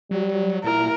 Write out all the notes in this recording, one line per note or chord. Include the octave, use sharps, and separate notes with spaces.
F#3 G3
A#2 E4 A#4